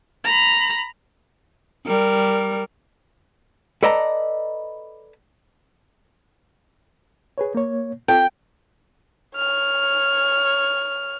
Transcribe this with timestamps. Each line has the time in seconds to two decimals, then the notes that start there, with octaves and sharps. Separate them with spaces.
0.25 A#5 B5
1.86 G3 A#4
3.83 A4 B4 D5 D#5 A5 A#5
7.38 G#4 B4 C#5
7.55 A#3 C#5
8.08 C4 F4 A4 G5
9.36 C#5 F6